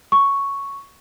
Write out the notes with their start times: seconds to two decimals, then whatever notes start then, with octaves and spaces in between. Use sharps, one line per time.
0.12 C#6